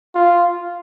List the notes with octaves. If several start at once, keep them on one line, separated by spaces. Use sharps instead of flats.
F4